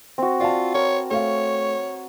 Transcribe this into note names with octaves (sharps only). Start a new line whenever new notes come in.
C4 F#4
F4 D5 F5 A5
A#4 C#5
A3 C#5 F5